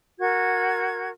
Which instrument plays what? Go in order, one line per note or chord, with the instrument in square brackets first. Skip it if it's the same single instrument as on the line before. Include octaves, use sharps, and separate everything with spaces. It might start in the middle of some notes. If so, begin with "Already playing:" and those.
[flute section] F#4 A#4 G#6